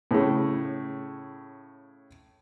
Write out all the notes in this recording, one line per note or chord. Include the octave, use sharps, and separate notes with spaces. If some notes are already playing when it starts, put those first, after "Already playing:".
A2 C#3